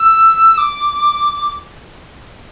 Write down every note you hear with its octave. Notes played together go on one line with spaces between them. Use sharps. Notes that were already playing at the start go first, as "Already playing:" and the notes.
Already playing: E6
D6